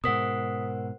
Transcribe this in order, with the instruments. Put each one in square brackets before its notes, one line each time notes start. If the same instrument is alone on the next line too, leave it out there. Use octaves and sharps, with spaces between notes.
[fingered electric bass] G#2 B2 [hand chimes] A#4 C5 F#5 [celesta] D#6 B6